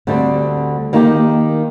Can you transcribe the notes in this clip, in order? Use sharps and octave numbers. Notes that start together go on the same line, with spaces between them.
D2 D3 G3 C4
D#3 A#3 D#4 G4